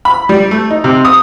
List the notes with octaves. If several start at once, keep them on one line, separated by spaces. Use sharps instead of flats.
B5
G3
A3
D#4
C3
D#6